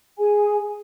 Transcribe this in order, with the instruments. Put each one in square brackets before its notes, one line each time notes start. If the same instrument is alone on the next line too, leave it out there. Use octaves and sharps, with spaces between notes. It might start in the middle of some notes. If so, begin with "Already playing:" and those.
[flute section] G#4 G#5